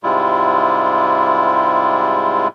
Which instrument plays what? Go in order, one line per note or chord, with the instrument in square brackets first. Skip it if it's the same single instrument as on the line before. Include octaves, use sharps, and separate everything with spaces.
[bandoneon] G#2 C3 G3 G#3 E4 F4